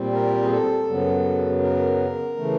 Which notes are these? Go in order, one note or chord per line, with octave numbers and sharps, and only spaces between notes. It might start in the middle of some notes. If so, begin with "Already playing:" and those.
Already playing: A#2 G3 C4
A#4
G#4
A4
F#2 C#3 F#3 B3
A#4
C#3 E3 A3